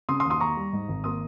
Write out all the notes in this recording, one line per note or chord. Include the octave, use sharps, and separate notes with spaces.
C#3 C6 D#6
C6 D#6
D#2
C6 D#6
D#2 A#5 C#6
G3
G#2
G#1
A#3 C6 D#6